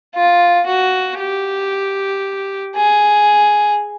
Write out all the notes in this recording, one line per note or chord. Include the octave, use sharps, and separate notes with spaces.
F4
F#4
G4
G#4